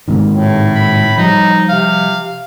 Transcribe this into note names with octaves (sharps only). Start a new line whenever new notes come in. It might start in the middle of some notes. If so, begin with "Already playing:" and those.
G#2 C3 D#3
A2
B5
F3 G3 D#4
C3 F5